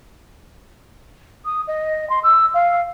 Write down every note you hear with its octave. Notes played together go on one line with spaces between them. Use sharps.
D#6
D#5
C6
E6
F5